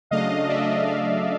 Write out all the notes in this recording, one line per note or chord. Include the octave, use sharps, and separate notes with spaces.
C#3 F#3 A3 D4 D#5 F5
D5 E5
C#3 F#3 A3 D4 D#5 F5